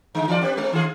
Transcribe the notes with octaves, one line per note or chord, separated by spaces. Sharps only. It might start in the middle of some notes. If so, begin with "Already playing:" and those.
D3 G#3
E3 F4 D5
C4 G4 B4
G#3 C4
D#3 F4 G#4